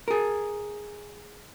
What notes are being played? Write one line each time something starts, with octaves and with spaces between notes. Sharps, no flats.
G#4 A#4